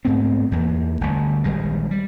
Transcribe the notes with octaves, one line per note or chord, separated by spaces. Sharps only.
G#2 A3 B3 C4
E2 A3 A#3
G1 D2
A#1 D#3 G3 G#3
G3